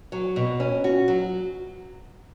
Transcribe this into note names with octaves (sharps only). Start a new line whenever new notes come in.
F#3
B2
C#4
F#4
F#3